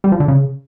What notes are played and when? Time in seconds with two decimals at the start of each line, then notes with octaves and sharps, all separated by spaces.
0.04 G3
0.12 F3
0.20 D3
0.28 C#3